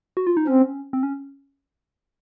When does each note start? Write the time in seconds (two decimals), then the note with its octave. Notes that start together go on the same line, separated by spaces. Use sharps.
0.17 F#4
0.27 F4
0.37 D#4
0.47 C4 C#4
0.93 C4
1.03 C#4